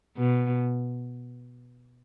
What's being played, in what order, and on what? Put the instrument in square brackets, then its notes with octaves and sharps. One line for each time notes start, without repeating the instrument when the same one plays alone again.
[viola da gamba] B2